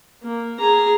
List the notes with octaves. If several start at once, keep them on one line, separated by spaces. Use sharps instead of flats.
A#3
G#4 A#5